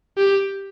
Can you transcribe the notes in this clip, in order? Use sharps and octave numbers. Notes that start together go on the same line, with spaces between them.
G4